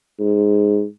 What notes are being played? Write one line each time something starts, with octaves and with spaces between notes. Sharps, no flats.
G#2